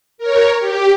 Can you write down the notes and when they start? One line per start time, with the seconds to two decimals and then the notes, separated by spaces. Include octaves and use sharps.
0.18 A#4 C#5
0.59 G4